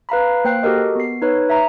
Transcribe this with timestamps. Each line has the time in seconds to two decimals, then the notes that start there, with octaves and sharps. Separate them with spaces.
0.09 B4 F5 A#5 B5
0.45 A#3 C5 G5 F#6 C7
0.63 F#4 G4 A4 A#4 D#5
0.95 B3 C7
1.22 D#4 B4 C#5
1.50 E5 A#5